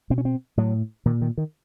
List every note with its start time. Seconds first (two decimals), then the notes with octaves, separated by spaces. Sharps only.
0.10 B2 C4
0.18 C#4
0.25 C4
0.57 A2 F#3
1.06 A#2 D#3
1.21 D#3
1.37 D#3